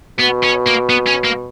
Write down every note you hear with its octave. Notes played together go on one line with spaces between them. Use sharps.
B2 B3
C#4
A#3
B3
C#4
A#3